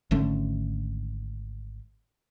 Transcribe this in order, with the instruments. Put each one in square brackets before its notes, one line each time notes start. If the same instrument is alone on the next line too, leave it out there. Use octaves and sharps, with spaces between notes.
[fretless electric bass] G#1 D3 A3 C#4